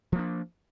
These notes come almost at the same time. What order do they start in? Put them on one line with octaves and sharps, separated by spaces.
F3 A#3 D4